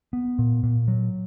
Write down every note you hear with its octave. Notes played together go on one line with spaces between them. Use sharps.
B3
A#2
A#2
F#3